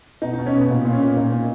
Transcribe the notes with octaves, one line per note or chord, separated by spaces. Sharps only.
B2 D#4
B2 D#4
C#4
B2 B3
A#2 D#4
A#2
C#4
A#2
A#2 D#4
A#2